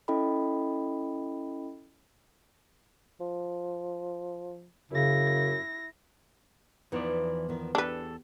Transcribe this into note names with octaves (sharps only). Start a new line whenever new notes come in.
C#4 E4 A4 D#5 G5 B5
F3
F#2 C#3 E4 A#6
E2 E3 F3 B3 D#4 D5
D#3 B3
E2 D4 G4 A4 B4